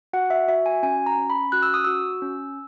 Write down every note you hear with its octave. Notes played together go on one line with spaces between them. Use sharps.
F#4 F#5
E5
F#4 E5
G#5
C#4 G#5
A#5
C#4
B5
F#4 F#6
E6
D#6
F#4 E6
C#4